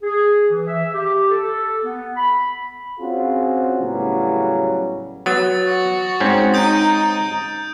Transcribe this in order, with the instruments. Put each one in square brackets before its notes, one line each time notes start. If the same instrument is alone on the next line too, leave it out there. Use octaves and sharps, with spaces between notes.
[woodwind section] G#4
E3
E5
G4
A4
B3
B5
[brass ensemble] C4 C#4 F4 F#4 G#4
A2 C#3 F#3 G3 B3
[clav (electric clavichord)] F#3 B3 [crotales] D#6 A6
[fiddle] F#4
[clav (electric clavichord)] G#2 C4 C#4
[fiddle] D#4 [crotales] D#6 G6 D7